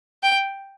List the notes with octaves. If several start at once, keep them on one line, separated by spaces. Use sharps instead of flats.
G5